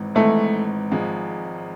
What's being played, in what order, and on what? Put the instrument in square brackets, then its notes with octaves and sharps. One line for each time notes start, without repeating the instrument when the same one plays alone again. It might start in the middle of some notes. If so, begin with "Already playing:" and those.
Already playing: [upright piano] G#1 G#2 E3
[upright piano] G#1 G#2 E3 [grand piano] A3
[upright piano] G#1 G#2 F3 G#3